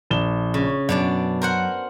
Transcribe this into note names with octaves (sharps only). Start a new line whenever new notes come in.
A#1 E7 G7
C#3
F#2 B2 D4 D5
A#4 C5 F#5